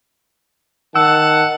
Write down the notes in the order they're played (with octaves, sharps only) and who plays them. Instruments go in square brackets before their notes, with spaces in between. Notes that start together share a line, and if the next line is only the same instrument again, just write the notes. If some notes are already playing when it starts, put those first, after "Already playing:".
[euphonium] D#3 [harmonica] F#5 A5 [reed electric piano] E6